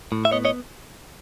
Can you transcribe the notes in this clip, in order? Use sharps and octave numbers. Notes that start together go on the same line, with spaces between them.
A2
E5
B3 C#5 D#5
C#5 D#5